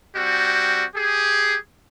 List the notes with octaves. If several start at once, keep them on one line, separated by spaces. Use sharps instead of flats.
G3 C4 F#4
G4 G#4